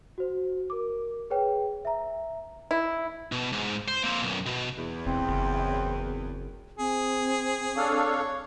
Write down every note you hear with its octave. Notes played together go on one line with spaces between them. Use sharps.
F#4 C5
A#4 D6
G#4 B4 C#5 G5
E5 A#5
E4
B2
G#2
C5
A#3 C4
B1 F#2
B2
E2
E1 C4
F#1
C4 G#4
D4 A4 C#5 F5